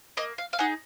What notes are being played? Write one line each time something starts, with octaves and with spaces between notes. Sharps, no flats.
A#3 D#5
F5
F5
D#4 G#4 F#5